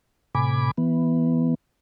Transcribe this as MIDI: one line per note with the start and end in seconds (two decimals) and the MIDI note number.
0.35 0.71 45
0.35 0.71 48
0.35 0.71 80
0.35 0.71 83
0.35 0.71 86
0.77 1.55 52
0.77 1.55 59